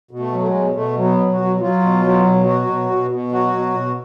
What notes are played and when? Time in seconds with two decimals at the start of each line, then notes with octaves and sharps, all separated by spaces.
0.11 B2
0.19 A3
0.33 F#3
0.40 A3
0.47 G#3
0.54 B2
0.75 B2 A3
0.97 F#3
1.04 B3
1.18 B2
1.32 F#4
1.40 F#3
1.60 F#3 F4
1.82 B2
2.04 F#3
2.25 B2
2.46 F#3 F#4
2.67 B2
2.90 B2
3.11 B2
3.32 F#3 F#4
3.53 B2
3.74 B2